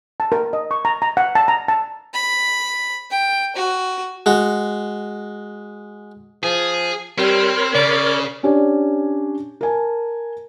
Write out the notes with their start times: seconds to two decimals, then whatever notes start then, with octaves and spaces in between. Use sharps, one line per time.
0.20 A5
0.32 A#4
0.53 D#5
0.71 C#6
0.85 A#5
1.02 A#5
1.17 F#5
1.35 A5
1.48 A#5
1.68 A5
2.13 B5
3.10 G5
3.56 F#4
4.26 G#3 F#4
6.43 F3 G#4
7.18 G3 C4 A#4 C#5 B5
7.75 C#3 D5
8.43 C#4 D4 G4 C#5 D5 G#5
9.61 A#4 G#5 A5